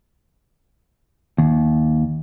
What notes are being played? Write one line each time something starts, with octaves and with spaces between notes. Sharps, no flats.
D#2